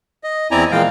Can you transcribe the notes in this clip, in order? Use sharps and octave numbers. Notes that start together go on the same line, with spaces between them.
D#5
E2 C4 E4 D5 G#5 A#5
A#2 E3 F3 G#3 F5 G5